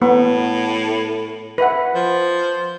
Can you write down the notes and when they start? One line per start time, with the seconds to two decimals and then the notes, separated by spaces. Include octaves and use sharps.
0.02 A2 B3
1.58 B4 E5 F#5
1.95 F3